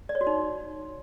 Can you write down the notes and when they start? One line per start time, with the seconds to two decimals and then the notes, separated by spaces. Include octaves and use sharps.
0.09 D5
0.15 C#5
0.21 F#4
0.27 D#4